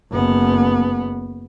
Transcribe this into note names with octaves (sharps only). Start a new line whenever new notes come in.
F#1 B3